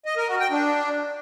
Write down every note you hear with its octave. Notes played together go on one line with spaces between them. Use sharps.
D#5
A#4
F#4
G5
D4